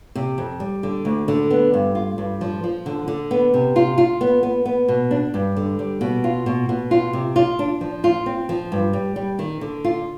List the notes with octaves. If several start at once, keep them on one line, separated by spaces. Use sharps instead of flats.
C3
F2
G3
D3
D2
D3
B3
G2
F4
G2
F3
F3
D3
D3
B3
C3
F4
F4
B3
B3
B3
B2
D4
G2
D3
G3
B2
F4
B2
B2
F4
C3
F4
D4
F3
F4
C4
F3
G2
G3
G3
D#3
D3
F4